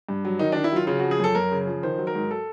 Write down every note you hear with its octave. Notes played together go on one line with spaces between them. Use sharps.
G2
F#3
D#3 D#4
D#3 D4
E4
F#3 F4
C#3 F4
F3 F#4
G#4
F#2 A4
F#2 A#4
C#3
F3
D#3 C5
F#3
A#4
G#2
A4